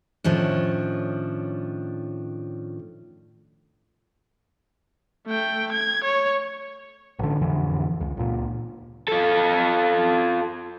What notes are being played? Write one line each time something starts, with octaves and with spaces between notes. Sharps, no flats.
A2 D#3 F3 C#4 D4
A3 G5
G#6
C#5
A1 D3
A1 F2 D3 E3
C#2
C#2 A#2
F4 A4